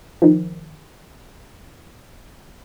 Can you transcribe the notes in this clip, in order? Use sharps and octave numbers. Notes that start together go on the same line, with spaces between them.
D#3 F3